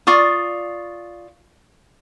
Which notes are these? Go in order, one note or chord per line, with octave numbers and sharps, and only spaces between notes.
F4 D5 C#6 D#6